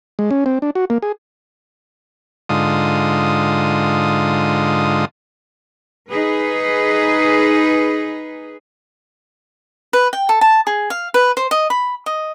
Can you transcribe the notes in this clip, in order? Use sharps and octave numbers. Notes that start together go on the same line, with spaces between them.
G#3
C#4
C4
D4
F#4
A#3
G#4
G#2 D3 F4 D#6
D#4 G#4 B4
B4
G5
A4
A5
G#4
F5
B4
C5
D#5
B5
D#5